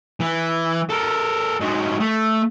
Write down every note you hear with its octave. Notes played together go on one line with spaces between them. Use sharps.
E3
A4 A#4
G#2 F#3
A3